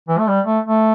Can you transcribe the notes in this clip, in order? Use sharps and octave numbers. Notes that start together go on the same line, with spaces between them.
E3
A3
G3
A3
A3